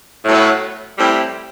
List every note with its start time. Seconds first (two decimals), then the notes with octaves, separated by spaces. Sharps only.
0.25 A2 F#3 B3
0.97 A2 G3 C4 E4